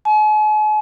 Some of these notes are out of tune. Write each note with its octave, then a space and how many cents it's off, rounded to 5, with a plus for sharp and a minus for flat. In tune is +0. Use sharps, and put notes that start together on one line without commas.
G#5 +45